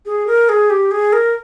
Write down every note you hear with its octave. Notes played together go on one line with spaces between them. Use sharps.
G#4
A#4
G#4
G4
G#4
A#4